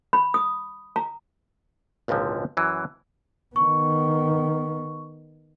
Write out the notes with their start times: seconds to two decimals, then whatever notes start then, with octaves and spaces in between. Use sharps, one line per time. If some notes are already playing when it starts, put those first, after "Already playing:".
0.13 B5
0.34 D#6
0.96 A#5
2.08 G#1 C#2 A#2 D3 F3
2.57 F#2 E3 F#3
3.56 D#3 B3 C#6